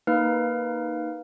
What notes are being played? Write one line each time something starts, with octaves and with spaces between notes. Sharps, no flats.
A#3 D#4 B4 F5 F6